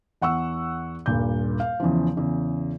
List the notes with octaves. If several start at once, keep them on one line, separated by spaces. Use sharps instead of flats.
E2 F#5 C#6 E6
D#1 G2 A#2 G6
F5
E2 C#3 E3 F3
E2 C#3